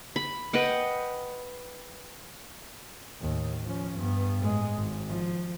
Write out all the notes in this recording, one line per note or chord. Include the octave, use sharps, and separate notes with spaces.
B5
B4 D#5 F#5 G5
D#2 A2
F3 C#4
G2 B3
A2 G#3
G#1
F3